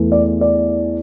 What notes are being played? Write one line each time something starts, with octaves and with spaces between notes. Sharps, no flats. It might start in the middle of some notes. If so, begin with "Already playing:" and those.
Already playing: E2 E3 A3
D5
D5